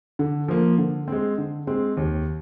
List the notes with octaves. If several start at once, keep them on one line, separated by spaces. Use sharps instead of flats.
D3
F3 A#3
D3
G#3 C4
D3
G#3 C4
D#2